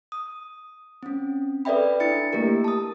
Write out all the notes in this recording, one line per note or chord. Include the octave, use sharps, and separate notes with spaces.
D#6
C4 C#4
A4 B4 D5 E5 G5 B5
D4 E4 A6 C#7
A3 A#3 G4 A#4
A5 D#6